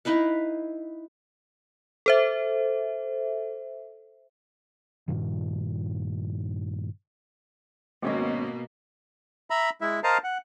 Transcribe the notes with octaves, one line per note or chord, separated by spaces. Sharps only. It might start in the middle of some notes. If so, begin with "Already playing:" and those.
D#4 E4 B4 F5
A4 C5 E5
G2 A#2 D#3
G#1 B2 A#3 C#4 D#5
E5 A#5 B5
G#3 E4 E5
A#4 C5 D#5 F5 A5 A#5
F#5